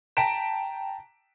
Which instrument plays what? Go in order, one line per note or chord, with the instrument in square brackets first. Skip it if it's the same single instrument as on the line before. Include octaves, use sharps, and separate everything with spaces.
[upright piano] G5 A5 A#5 B6 D7 E7